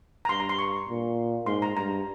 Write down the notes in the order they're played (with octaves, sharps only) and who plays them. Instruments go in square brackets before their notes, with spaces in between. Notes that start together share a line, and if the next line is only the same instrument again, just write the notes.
[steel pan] A#5
[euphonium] G2 [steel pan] C6
[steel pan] A#5
C6
C#6
[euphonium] A#2
[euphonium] G#2 [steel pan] C6
[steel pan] A#5
[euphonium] G2 [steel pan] A#5